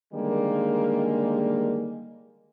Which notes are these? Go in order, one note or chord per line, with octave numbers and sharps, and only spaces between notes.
D3 D#3 G3 G#3 A#3